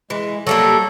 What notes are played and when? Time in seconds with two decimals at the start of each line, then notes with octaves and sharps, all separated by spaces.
0.10 E3 G#3
0.47 F#3 G3 A#3 A4